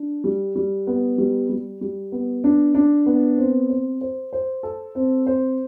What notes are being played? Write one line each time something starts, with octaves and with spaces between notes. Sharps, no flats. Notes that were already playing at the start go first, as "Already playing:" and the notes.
Already playing: D4
G3
G3
B3
G3
G3
G3
B3
D4
D4
B3
C4
C5
C5
C5
A4
C4
C5